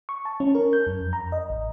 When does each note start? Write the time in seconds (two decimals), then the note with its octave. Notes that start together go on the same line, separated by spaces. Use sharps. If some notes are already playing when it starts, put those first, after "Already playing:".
0.09 C#6
0.25 A5
0.40 C#4
0.55 A#4
0.73 G6
0.87 F#2
1.01 F2
1.13 A#5
1.32 D#5
1.50 A1